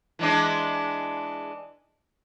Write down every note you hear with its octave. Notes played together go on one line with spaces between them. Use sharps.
E3 G#3 D4